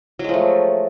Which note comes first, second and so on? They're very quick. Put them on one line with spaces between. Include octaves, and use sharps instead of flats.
F#3 G#3 F3 A3